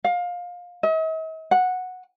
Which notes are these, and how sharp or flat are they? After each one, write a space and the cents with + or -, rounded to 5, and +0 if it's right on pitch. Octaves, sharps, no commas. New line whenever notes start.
F5 +25
D#5 +45
F#5 -10